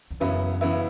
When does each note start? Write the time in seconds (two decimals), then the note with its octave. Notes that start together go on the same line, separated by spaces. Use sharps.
0.11 E2
0.20 F#2 C#3 E3 B3 E4
0.61 C#3 E3 B3 E4